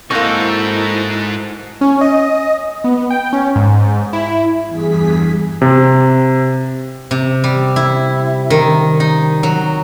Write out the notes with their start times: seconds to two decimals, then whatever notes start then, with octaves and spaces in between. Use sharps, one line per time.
0.11 G#2 A#3 C4 D#4 E4 F#4 A4 C#6
1.81 C#4
2.01 D#5
2.84 B3
3.10 G5
3.33 C#4
3.56 G#2
4.13 E4
4.66 E2 G2 G#4 B6
5.62 C3
7.11 C3
7.44 G3
7.76 E4
8.50 D#3
9.00 D#4
9.43 F#3